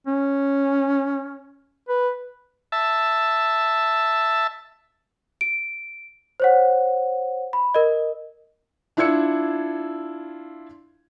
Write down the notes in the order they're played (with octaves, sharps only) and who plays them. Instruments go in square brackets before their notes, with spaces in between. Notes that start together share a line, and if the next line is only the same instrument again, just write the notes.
[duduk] C#4
B4
[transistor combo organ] E5 A5
[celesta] D7
C5 C#5 F#5
B5
A#4 D#5
[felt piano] D4 E4 F4 E6 G#6 C#7